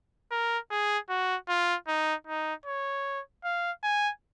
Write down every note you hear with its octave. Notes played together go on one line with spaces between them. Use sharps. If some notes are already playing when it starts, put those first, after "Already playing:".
A#4
G#4
F#4
F4
D#4
D#4
C#5
F5
G#5